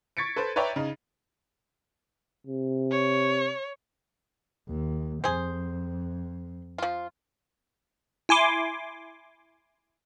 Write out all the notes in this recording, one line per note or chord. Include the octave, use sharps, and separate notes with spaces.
C#6 G#6 A6 B6 C#7 D7
A4 B4 C5
B4 C#5 D5 E5 G5 A#5
C#3 D#4
C3
C#5
D#2
F2 G#4 C5
F3 F4
E4 G#5 C6 D6